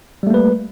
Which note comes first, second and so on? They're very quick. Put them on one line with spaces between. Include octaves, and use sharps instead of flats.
G3 A3 A#3 B4